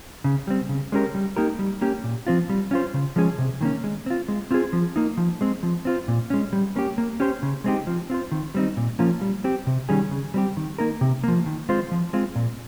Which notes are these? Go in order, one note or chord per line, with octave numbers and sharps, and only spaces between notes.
C#3
G3 C4
C#3
G#3 C#4 G4 A#4
G3
A#3 D#4 G4 A#4
G3
A#3 C#4 G4
A#2
F3 C4 F4
G3
C#4 F4 C5
C#3
F3 G#3 C#4 G#4
C3
D#3 A#3 C#4
G#3
C4 F4
G#3
C4 F4 G#4 C5
F3
A#3 D#4
F3
G#3 C4
F3
C4 F4 C5
A#2
G#3 C#4
G3
A#3 C#4 G4
A#3
C#4 G4 C5
C#3
G#3 C4 D#4 G4
F3
C4 F4 C5
D#3
G3 C4 D#4
A#2
F3 A#3 C#4 F4
G3
C4 G4
C3
D#3 G3 C#4 G#4
C#3
G3 C4 G4
D#3
A#3 D#4 A#4
C3
F3 A#3
D#3
G#3 C4 F4 C5
F3
G#3 C4 F4
A#2